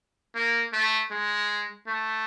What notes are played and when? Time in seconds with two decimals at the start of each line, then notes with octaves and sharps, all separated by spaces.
0.35 A#3
0.73 A3
1.11 G#3
1.87 A3